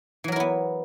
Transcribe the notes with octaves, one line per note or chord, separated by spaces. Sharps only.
E3 F#3 B3 E4 A#4